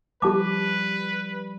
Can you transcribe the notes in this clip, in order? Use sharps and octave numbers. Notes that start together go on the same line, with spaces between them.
F3 G3 G4 B4 A5 D6